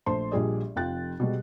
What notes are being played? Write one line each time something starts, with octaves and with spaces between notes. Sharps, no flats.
A#1 A3 C5 A5 C6
A#1 A#2 G3 G#4 D5 D#5
F1 F2 F4 G5 F#6 A6
B2 G3 G#3